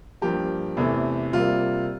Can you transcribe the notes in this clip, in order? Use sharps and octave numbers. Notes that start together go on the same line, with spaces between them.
G2 F3 A#3 G4
E2 C3 E3 A3
C3 G3 A#3 F4